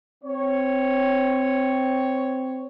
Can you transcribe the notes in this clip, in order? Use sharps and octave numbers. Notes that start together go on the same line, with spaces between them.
C4 C#5